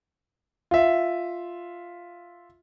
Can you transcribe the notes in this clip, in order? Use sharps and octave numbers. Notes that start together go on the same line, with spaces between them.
F4 E5